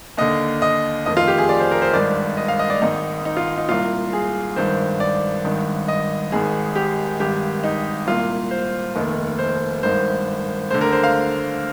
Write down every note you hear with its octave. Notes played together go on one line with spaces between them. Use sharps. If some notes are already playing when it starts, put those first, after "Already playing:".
D#2 D3 D#5
D#5
F1 F2 D#3 D#5
F4
G4
G#4
D5
C5
A#4
C5
G#1 G2 D#3 D5
D#5
F5
D#5
D5
G#1 G#2 D#3 D#4
D#4
F4
D#4
C2 A#2 F4
G#4
G#1 G2 D#3 C5
D5
G#1 G2 D#3
D#5
G#1 G#2 D#3 G#4
G4
G#1 G2 D#3 G4
D#4
C2 A#2 F4
C5
F1 D#2 D#3
C5
G#1 G2 D#3 C5
D2 D3 C5
A#4
C5
F5